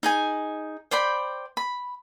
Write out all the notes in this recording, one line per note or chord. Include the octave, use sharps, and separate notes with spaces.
D#4 G#4 G#5
C5 D5 G5 B5
B5